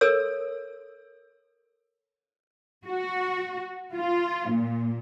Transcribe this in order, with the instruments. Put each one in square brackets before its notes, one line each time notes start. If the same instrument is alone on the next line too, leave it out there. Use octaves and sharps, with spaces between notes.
[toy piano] A4 A#4 C#5 E6
[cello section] F#4
F4
A#2